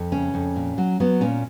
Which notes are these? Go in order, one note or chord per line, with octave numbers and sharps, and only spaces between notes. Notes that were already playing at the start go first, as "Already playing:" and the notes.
Already playing: F2
C#3 C#4
F2
A#2
F#3
F#3 B3
A#2 C#4